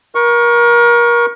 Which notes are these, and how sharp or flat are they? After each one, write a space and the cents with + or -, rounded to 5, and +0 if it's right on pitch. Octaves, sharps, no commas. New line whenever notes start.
A#4 +30 C#6 +0